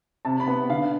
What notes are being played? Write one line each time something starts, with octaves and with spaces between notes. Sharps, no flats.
C3 A5
B5
B3
D3 F5